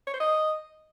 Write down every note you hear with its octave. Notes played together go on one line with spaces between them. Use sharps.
C#5
C5
D#5